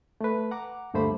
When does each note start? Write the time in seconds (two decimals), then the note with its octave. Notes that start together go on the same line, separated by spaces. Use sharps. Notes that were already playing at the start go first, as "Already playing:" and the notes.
0.21 A3 B4
0.51 F#5 A#5 D6
0.94 D2 G2 A3 A#3 C5 B5